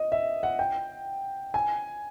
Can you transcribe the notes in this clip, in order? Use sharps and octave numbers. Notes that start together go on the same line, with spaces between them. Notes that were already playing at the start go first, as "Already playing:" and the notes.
Already playing: D#5
E5
F#5
G5
G#5